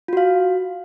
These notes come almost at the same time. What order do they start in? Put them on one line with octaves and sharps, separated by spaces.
F4 F#4 F5